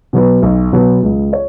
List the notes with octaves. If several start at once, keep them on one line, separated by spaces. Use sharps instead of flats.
B2 F#3 B3
B1
B2 F#3 B3
C#2
C#5